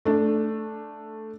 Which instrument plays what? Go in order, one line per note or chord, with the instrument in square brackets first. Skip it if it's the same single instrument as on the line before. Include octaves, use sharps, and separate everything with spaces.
[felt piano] A3 D4